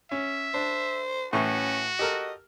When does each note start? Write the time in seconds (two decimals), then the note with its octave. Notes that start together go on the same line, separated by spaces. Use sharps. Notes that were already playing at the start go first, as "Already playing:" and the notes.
0.11 C#4 E5
0.54 D4 C5
1.33 A2 E3 C#4 F#4 C#6
1.99 G4 A4 A#4 D#5